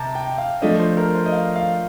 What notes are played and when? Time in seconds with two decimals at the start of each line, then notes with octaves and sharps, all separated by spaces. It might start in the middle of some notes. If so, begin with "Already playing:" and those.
Already playing: C3 A5 A#5
0.15 G5
0.38 F5
0.62 F3 A3 D4 D#5
0.79 C5
0.97 A#4
1.15 C5
1.26 D#5
1.32 F5
1.56 F5